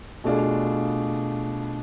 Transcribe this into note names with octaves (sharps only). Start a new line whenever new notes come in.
B2 A3 D4 F4 G#4